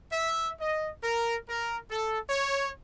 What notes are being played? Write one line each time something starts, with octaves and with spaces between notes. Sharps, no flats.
E5
D#5
A#4
A#4
A4
C#5